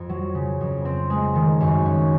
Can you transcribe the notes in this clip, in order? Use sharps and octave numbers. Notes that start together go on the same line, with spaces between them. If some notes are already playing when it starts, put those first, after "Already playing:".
Already playing: F2
F#3
C#3
F2
C4
G#3
D#3
F#2
C#4